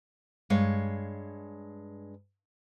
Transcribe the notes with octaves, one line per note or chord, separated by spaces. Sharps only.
G2 G#3 C#5 F5